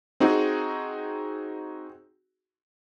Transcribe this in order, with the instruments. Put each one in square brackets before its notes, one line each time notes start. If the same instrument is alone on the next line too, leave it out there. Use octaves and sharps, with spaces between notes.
[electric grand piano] C4 D#4 F#4 G#4